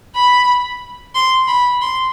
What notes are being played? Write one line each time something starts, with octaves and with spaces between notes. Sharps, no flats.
B5
C6
B5
C6